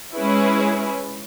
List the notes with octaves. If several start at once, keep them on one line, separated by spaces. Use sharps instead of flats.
G#3 C#4 E4 G#4 B4